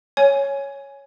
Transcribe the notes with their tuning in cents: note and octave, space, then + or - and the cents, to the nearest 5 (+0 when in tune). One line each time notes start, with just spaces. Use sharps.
C#5 +0 G#5 +0